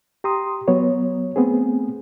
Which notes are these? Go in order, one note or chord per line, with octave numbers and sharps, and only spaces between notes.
G4 A#5 C6 D#6
F#3 B3 C#5
A3 B3 C4 G#4